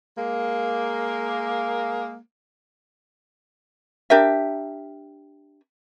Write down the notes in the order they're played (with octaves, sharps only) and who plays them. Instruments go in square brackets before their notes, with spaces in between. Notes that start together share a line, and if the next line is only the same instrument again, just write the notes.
[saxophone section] G#3 A#3
[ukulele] D4 G4 A#4 E5